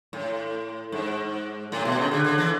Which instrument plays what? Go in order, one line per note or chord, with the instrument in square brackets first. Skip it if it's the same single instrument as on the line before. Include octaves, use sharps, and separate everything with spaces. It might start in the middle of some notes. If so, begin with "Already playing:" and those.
[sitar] A2
G#2
A2
B2
C#3
D3
D3
E3